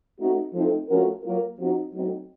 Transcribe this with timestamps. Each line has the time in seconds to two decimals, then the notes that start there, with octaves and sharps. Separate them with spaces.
0.19 A3 C4 D#4 F#4
0.54 F3 A3 C4 D#4 A4
0.89 F3 A3 C#4 F#4 A#4
1.23 F#3 A#3 F4 A#4
1.58 F3 C4 D#4 F#4
1.93 F#3 A3 C4 D#4